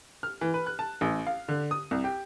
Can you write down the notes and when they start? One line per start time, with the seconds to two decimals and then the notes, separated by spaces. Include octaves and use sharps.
0.23 F6
0.41 E3
0.54 B4
0.66 F#6
0.79 A5
1.01 A1
1.27 F5
1.48 D3
1.71 D#6
1.91 C2
2.04 G4